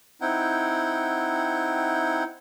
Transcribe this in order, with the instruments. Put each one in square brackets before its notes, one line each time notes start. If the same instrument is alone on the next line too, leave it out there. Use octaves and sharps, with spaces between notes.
[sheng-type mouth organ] C4 D#4 E4 F#5 G5